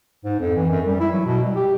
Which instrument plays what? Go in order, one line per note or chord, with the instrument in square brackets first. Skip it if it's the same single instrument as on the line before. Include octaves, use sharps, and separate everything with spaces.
[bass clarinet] G#2
F2
E3
F#2
G3
E4
F#3
B2
G3
G4